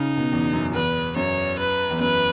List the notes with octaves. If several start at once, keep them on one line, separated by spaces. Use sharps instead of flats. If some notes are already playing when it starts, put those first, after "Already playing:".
Already playing: C#3 D#4
B2
E2
F#2
E2 B4
F#2 C#5
B4
E2
F#2 B4